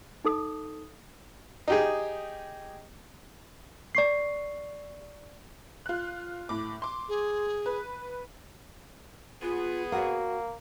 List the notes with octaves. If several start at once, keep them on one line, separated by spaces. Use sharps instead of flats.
D#4 A4 D#6
D#4 G4 G#4
D5 C#6 C7
F4 F#6
A2 D6
C6 D6
G#4
B4
B3 F4 G#4
A#3 F#4 C#5 F#5